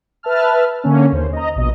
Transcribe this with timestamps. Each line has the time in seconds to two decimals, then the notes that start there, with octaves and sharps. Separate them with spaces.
0.23 B4 E5 A5 F6
0.84 D3 A#3 C#4
1.12 D#2 C5
1.33 D#5 A#5
1.56 A#1 B2 D#5